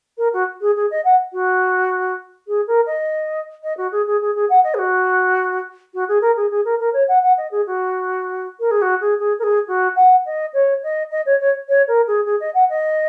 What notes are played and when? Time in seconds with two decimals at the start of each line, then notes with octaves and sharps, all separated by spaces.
0.18 A#4
0.33 F#4
0.61 G#4
0.76 G#4
0.90 D#5
1.04 F#5
1.32 F#4
2.47 G#4
2.67 A#4
2.86 D#5
3.63 D#5
3.77 F#4
3.92 G#4
4.07 G#4
4.21 G#4
4.35 G#4
4.49 F#5
4.63 D#5
4.74 G#4
4.78 F#4
5.94 F#4
6.08 G#4
6.21 A#4
6.36 G#4
6.50 G#4
6.65 A#4
6.79 A#4
6.93 C#5
7.08 F#5
7.22 F#5
7.37 D#5
7.51 G#4
7.66 F#4
8.60 A#4
8.71 G#4
8.81 F#4
9.00 G#4
9.19 G#4
9.39 A#4
9.43 G#4
9.67 F#4
9.96 F#5
10.25 D#5
10.53 C#5
10.83 D#5
11.11 D#5
11.26 C#5
11.40 C#5
11.68 C#5
11.88 A#4
12.07 G#4
12.25 G#4
12.40 D#5
12.54 F#5
12.69 D#5